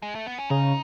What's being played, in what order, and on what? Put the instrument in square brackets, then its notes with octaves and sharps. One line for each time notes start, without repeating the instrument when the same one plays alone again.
[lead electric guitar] G#3
A3
B3
C#4
[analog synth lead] C#3 [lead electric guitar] D#4